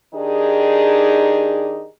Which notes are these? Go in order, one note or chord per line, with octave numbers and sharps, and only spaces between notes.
D#3 D4 D#4 G4 G#4